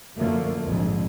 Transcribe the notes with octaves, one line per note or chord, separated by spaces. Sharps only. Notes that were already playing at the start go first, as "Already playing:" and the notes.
A1 F#2 D3 F3 A3 A#3
A#1 F2 G#2 D3 G#3